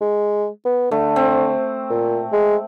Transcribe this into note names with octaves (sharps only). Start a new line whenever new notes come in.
G#3
B3
D3 A3
C4
A#2
G#3